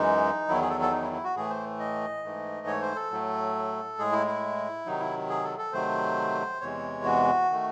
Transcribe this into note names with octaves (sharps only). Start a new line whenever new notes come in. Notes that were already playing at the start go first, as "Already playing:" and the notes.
Already playing: F#2 E3 G#3 D#4
E2 D#3 F#3 E4
G#4
A4
A4
D#4
E4
E4
F#4
A2 E3 A3 G#4
C5
D#5
G#2 E3 A3
C#5
C5
A4
A2 F#3 A3
A2 G#3 G#4
E4
E4
C3 D#3 F#3 D#4
E4
G#4
A4
A4
C3 D#3 F#3 A3 C5
E2 C3 E3 G#3 C#5
F#4
D#3 A3